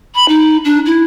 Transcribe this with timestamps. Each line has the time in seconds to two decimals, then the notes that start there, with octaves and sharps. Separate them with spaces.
0.14 B5
0.28 D#4
0.65 D4
0.85 E4